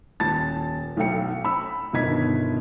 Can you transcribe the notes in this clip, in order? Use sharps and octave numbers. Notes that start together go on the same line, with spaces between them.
D#1 A5 A6
B1 A3 A4 G5 C#7
B5 E6
G1 B2 D#3 D#5 G#6 B6